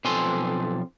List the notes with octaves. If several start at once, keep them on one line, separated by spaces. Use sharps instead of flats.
B1 F3 C4 A4 G#5 C6